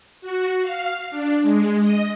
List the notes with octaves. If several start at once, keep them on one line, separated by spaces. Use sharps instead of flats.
F#4
F5
D4
G#3
D#5